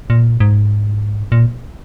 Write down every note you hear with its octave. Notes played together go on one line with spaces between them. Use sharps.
A#2
G#2
A#2